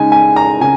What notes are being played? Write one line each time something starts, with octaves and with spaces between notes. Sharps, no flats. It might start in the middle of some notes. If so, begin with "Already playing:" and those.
Already playing: C#3 G#3 D#4 G#5
G#5
A#5
C#3 G#5